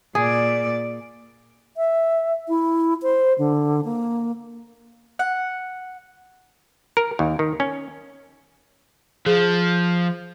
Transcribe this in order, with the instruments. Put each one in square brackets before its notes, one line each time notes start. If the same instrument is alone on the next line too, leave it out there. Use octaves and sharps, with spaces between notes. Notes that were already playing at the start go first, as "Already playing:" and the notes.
[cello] A#2 D5 [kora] G#4
[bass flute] E5
E4
C5
D3
A#3
[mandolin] F#5
[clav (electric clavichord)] A#4
D#2
D#3
C#4
[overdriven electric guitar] F3 [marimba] G#4